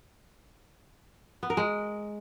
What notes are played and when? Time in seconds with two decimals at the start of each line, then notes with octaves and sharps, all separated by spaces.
1.43 B3
1.50 A#4
1.57 G#3